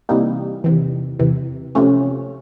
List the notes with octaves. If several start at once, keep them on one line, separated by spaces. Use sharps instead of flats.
C3 E3 G3 A#3 D#4
E2 C3 E3
E2 C3 E3
C3 F3 A3 C#4